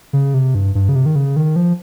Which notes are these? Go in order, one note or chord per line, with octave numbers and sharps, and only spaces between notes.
C#3
C3
G2
G2
C#3
C3
D#3
C#3
D#3
F3